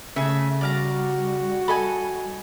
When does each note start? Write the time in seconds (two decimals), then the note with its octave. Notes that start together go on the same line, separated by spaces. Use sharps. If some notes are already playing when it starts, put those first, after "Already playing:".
0.16 C#3 A3 E5 G#5
0.61 G3 F#4 D5 F5 A#5
1.68 A4 D#5 G#5 B5